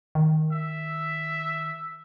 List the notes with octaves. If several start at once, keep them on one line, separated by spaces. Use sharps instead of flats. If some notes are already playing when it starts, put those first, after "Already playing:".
D#3
E5